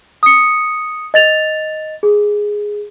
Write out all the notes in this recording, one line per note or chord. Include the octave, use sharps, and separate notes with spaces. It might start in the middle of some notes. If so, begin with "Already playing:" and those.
D#6 C#7
D#5 A6 F7
G#4